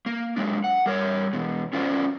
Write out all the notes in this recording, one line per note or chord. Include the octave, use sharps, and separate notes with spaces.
A#3
F#3 G#3 D4
F#5
G3 A#4 C#5
E2 B2
C#4 F4 F#4 A#4 C5 D5